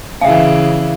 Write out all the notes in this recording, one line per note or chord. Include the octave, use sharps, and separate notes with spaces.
C#3 E3 E5 F5